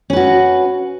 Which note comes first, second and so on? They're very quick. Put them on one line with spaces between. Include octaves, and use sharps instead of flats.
C#4 B4 F#4